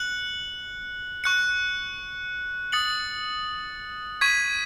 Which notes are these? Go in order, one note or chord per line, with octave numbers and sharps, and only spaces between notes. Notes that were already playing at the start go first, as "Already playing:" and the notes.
Already playing: F#6 C#7 F#7
C#6 F#6 C#7
D#6 A6 C#7 F#7
C#6 G#6 B6 D#7